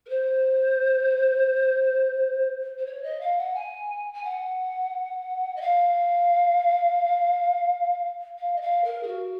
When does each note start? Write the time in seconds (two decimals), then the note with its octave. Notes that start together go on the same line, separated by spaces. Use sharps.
0.06 A#4
0.09 C5
2.79 C5
2.86 C#5
3.03 D#5
3.21 F5
3.38 F#5
3.55 G#5
4.14 G#5
4.24 F#5
5.56 D#5
5.62 F5
8.38 F5
8.56 D#5
8.62 F5
8.84 A#4
9.03 G#4
9.07 F#4